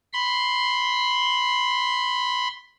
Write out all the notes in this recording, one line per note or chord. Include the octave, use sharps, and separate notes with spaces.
B5 C6